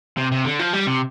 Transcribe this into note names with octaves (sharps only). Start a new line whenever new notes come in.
C3
C3
D3
F3
G3
C3